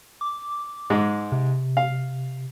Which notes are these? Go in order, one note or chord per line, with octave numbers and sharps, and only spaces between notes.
D6
G#2 G#3
C3
F5